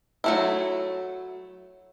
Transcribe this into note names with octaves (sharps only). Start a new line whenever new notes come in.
F#3 A3 E4